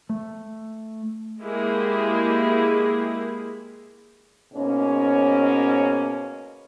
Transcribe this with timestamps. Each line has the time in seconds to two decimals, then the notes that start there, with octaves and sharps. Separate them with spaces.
0.09 A3
1.41 G#3 A#3 E4 G4 G#4
4.54 G#2 B2 A#3 C#4